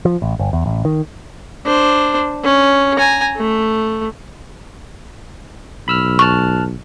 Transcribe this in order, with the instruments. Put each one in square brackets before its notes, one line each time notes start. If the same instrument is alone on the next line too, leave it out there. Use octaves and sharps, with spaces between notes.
[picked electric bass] F3
A1
G1
E2
A1
D#3
[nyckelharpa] D4 C5
C#4
G#5 A#5
A3
[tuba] B1 [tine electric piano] B5 E6 F6
[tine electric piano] A5 F6 F#6 [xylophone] C#6